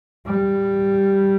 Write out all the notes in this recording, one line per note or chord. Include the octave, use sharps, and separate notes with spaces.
G3